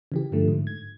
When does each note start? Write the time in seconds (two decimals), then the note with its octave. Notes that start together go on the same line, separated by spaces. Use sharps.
0.12 C#3 E3 G4
0.32 G2 D3 F3 A3
0.48 G#2
0.67 G#6